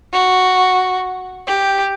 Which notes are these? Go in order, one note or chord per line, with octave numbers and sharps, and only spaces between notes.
F#4
G4